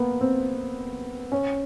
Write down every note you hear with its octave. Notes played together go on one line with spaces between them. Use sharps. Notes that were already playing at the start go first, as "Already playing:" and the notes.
Already playing: A#3 B3
C4
C#4